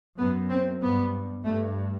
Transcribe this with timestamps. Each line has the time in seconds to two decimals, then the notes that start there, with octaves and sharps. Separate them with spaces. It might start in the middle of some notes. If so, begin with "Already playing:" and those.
0.18 F#2 B3
0.49 C4
0.81 G2 B3
1.45 G2 A3